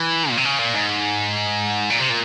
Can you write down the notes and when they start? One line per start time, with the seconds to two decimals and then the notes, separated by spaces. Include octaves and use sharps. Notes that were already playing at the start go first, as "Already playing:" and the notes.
Already playing: E3
0.30 A#2
0.37 C3
0.45 C#3
0.59 A#2
0.74 G#2
1.90 A#2
1.99 C3
2.09 A#2